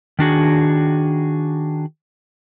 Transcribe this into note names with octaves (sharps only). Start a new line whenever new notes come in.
D#3 D4 F#4 G#4